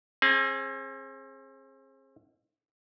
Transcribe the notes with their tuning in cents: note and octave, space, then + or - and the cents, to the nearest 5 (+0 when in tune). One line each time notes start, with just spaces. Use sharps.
C4 +40 G#4 +0